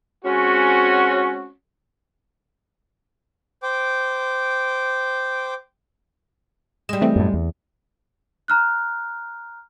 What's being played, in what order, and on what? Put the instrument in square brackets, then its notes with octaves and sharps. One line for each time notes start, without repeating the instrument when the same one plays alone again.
[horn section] G#3 C4 C#4 F#4
[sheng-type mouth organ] C5 G5 D6
[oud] G3 G#3 [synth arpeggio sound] E7
[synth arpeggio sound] E3 A3 C4
[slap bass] F#2 A2
E2
[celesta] A#5 F6 F#6